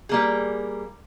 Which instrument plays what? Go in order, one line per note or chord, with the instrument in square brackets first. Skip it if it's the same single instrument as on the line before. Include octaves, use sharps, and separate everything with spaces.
[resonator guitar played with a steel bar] G3 A#3 G#4